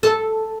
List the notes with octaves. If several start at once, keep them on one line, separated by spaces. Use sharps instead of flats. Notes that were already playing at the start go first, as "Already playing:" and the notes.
A4